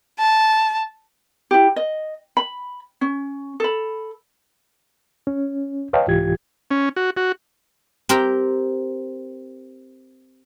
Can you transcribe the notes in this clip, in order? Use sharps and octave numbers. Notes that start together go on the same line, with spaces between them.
A5
E4 G4
D#5
B5
C#4
A4 B5
C#4
B4 C#5 D#5 F5 G5 A5
C2 G#2 E3 F4 G4 G#6
C#4
F#4
F#4
C4 G4 A#4